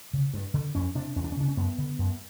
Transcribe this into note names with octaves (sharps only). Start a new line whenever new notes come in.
C#3
G2
D3
F2 C#4
C3 D4
E2 C#4
D4
C#4
C#3 D4
C#4
F#2 B3
D3
F#2